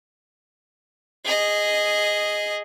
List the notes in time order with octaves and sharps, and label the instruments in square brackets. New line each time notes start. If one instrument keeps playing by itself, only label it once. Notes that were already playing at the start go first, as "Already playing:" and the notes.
[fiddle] G#4 D#5